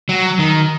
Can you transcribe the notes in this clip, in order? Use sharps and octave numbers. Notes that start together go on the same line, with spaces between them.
F#3
D#3